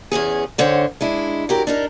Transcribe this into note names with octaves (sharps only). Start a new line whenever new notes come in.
E2 E3 C#4 G#4
G#2 D3 C5 C#5 G5
G#3 D4 E4
F#3 G4 A#4
D4 D#4 A#4